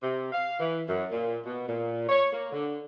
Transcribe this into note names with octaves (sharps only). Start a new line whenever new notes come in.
C3
F5
E3
F#2
A#2
B2
A#2
C#5
A#3
D3